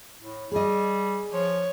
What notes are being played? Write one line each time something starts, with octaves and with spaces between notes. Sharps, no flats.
A2
G3 G#4 D#5
F3 C#5